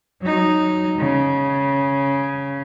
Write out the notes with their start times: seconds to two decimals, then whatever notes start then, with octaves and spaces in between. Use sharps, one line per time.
0.21 F#3 D#4
0.98 C#3